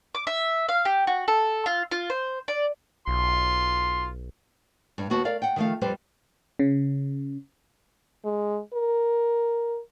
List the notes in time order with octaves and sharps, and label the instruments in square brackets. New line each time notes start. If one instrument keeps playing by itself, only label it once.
[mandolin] D6
E5
F5
G4
F#4
A4
F4
F4
C5
D5
[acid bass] B1 [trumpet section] F4 C6
[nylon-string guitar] G2
D#2 B3 F#4 A5
A#4 D5 F5
F#5 G5
D#3 F3 F#3 A3 F5
F2 G3 G4 B4 C5
[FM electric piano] C#3
[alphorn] G#3
A#4